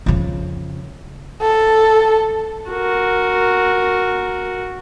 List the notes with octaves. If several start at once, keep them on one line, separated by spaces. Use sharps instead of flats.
F2 C#3
A4
F#4 A#4